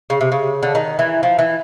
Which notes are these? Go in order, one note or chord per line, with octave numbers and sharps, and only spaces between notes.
C#3
C3
C#3
D3
D#3
E3
F3
E3